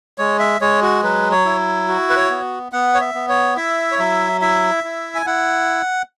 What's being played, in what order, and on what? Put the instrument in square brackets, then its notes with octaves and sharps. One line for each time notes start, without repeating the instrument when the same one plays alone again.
[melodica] G#3 C#5
E5
G#3 C#5
F#4
F#3 B4
C#5
E4
F#4
B4
C#5
B3
B3 F#5
C#5
E5
B3
C#5
E4 E5
C#5
F#3 E5
E4 E5
E4
G#5
E4 F#5